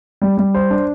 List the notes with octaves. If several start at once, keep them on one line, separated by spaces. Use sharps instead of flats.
G3
G3
C5
D4